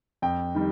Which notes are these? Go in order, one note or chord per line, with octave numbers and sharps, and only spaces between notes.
F2 G5
D#3 G3